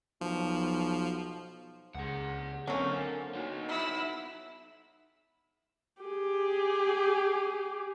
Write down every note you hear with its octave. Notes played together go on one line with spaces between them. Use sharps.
B1 F3
C#2 G#4 F#5
D3 F#3 A#3 C4 C#4 A#4 G#5
D#4 F#4
E4 D#5
G4 G#4